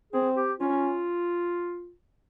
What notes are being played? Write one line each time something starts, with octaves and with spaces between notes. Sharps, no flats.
C4 G#4
G4
C#4 F4